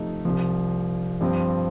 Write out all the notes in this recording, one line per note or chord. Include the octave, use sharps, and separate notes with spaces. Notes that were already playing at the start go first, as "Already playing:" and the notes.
Already playing: C3 F3 A3 D#4
C2 C3 F3
G2 F3 C4